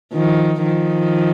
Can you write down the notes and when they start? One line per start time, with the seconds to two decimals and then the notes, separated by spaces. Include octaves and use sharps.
0.13 D#3 F3
0.64 D#3 F3